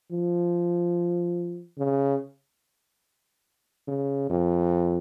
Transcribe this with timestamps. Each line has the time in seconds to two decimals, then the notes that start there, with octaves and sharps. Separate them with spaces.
0.11 F3
1.78 C#3
3.88 C#3
4.29 F2